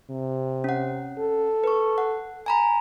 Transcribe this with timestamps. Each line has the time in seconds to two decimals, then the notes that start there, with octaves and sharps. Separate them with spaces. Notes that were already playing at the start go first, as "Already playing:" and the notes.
0.11 C3
0.64 C#4 F#5
1.19 A4
1.64 B4 C#6
1.98 F#5
2.46 G#5 A#5 B5